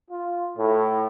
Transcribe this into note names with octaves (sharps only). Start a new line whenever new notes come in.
F4
A2